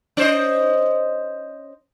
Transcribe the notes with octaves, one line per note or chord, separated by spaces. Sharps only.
C#4 C5 D#5